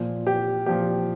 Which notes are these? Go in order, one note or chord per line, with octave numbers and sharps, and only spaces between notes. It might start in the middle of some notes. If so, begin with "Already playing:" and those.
Already playing: A#2 F3
G4
A#2 F3 G4